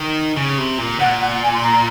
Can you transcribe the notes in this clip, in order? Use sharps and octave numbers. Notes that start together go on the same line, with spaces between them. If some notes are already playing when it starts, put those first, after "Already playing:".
Already playing: D#3
C#3
C3
A#2
A#2 F#5
F#5
G#5
C6
A#5